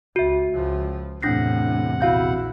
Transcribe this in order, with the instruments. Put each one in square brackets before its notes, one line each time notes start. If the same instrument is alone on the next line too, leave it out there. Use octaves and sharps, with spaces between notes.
[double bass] C#2 [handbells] F#4 E5
[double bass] C#2 F3
[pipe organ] E2 C3 F#5 [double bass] A2 [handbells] D4 A#6 C7
[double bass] A#1 E4 [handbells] F#4 F5 G6